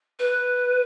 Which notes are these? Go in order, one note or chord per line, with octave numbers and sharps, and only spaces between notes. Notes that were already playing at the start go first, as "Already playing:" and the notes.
B4